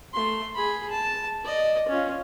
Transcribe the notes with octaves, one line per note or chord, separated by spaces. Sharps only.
A3 C6
G#4 B5
A5
D5 D#5
C#4 F4